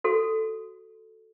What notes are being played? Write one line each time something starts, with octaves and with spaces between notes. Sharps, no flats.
F#4 A4 C5